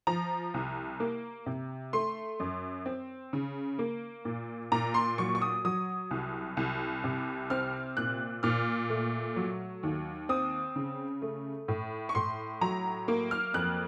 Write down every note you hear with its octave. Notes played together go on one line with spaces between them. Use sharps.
F3 A#5
C2
A#3
C3
A3 C6
F#2
C4
C#3
A#3
A#2
A#2 A#5
C6
F#3 C#6
C#6
D#6
F#3 D#6
C2
C2
C3
C4 F6
A#2 F#6
A#2 F6
A3
F#3
D#2
C4 D#6
C#3
A3
A2
C#6
A2 C6
F#3 A#5
A#3
F6
F2 F#6